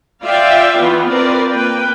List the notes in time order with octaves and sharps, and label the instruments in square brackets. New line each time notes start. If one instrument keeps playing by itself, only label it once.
[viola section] F4 D5 E5 F5 G5
E3 B3 F4
C4 F4 A#4 B4 D5
A#3 B4 G5